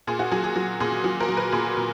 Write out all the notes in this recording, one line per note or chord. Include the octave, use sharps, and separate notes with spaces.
A#2 G#4
F#4
F#3 G#4
G#4
F#3
A#2 G#4
F#3
A#4
F#3
B4
A#2 G#4
A#2